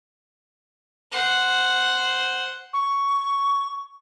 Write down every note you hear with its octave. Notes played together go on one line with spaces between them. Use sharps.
C5 F#5
C#6